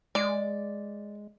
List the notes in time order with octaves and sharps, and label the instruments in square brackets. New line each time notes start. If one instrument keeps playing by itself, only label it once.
[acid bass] G#3 [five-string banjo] D5